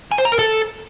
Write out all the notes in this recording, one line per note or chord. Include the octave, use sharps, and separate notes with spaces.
G#5
C5
A#5
A#4
A4